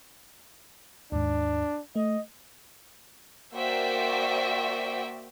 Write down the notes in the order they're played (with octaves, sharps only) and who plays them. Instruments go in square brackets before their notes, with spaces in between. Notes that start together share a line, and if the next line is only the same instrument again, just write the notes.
[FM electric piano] D#2 G#2 [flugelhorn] D4
[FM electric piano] A3 [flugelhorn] D#5
[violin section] A#3 F#4 C5 D5 E5 G5